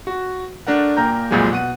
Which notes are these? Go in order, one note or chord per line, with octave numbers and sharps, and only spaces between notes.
F#4
A3 D4 A#4 F#5
A#2 A#3 A#4 G5 A#5 G6
C2 F2 A#2 F3 F#3 G#3
B2 F#5 D#7